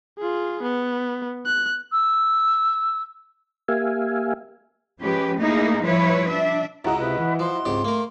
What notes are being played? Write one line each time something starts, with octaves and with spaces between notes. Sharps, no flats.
F4 G#4
B3
F#6
E6
A#3 G4 E5 F5 G#5
F3 G#3 C#4 G4 B4
A3 A#3 D#4 E4 G#4
F3 G3 E4 B4 C#5
D4 E5
C#2 E4 F#4 D#5 A#5
C3 B4
E3
F3 C6
C#2 G#2 C4 G4
A3 A#3 A#4